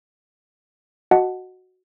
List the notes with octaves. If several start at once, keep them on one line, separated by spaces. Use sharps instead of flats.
F#4 D#5 F#5 A5